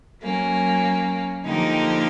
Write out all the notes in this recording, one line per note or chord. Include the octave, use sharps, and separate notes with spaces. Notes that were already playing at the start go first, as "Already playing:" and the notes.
F#3 A#3 C#4
D3 F3 A#3 D#4 G4